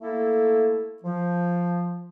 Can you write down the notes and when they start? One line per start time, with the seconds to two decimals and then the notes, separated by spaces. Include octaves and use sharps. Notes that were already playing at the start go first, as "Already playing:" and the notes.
0.01 A3 A#3 E4 A4
1.03 F3